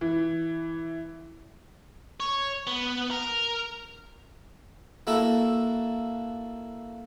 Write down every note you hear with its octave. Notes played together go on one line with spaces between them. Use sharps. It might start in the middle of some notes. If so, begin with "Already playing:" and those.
E3
C#5
B3
A#4
A#3 E4 F#4 A4